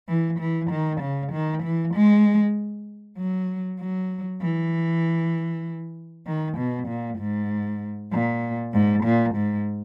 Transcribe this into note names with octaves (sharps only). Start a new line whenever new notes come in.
E3
E3
D#3
C#3
D#3
E3
G#3
F#3
F#3
E3
D#3
B2
A#2
G#2
A#2
G#2
A#2
G#2